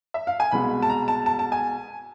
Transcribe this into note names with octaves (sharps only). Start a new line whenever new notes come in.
E5
F5
G#5
C2 B2 G#3 B5
A5
A#5
A5
A5
A5
G#5